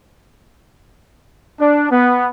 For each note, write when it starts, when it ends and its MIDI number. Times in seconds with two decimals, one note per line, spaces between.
1.60 1.88 62
1.91 2.28 59